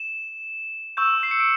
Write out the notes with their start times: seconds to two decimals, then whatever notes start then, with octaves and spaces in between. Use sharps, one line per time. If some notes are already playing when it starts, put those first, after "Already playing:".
Already playing: E7
0.97 C#6 E6 G6 E7
1.23 C7
1.31 C#7
1.40 D7